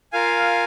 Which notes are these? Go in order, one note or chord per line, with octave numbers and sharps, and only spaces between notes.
F4 A#4 F5 G#5